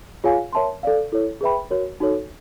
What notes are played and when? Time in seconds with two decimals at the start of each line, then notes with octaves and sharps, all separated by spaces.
0.24 F4 G#4 C#5 F5 G#5
0.53 A#4 C#5 E5 A5 C6
0.83 A4 D5 F5
1.12 E4 A4 C#5
1.41 G#4 B4 E5 G5 B5
1.71 F#4 A#4 C#5
2.00 D#4 F#4 A4 C#5